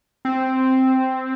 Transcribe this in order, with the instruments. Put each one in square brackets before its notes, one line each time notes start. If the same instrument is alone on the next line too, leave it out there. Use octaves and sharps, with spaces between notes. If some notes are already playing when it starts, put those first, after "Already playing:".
[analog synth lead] C4